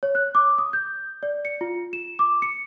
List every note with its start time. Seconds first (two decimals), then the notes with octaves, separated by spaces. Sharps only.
0.03 C#5
0.15 F#6
0.35 D6
0.58 D#6
0.73 G6
1.23 D5
1.45 C#7
1.61 F4
1.93 E7
2.19 D6
2.42 C#7